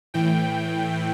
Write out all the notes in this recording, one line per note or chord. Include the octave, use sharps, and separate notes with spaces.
A2 E3 G5